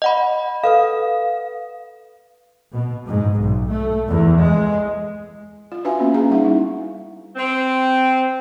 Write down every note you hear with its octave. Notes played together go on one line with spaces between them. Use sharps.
D#5 F#5 B5
A4 B4 F5 D#6
B2
G#2
B1
A3
E2
G#3
F4
D4 F#4 B4 E5 F5 G#5
A#3 B3 C#4 F#4
G#4 F5 A#5
G3 D#4 E5 F#5
E4
C4